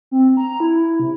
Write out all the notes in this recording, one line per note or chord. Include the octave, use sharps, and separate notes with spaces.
C4
A#5
E4
C3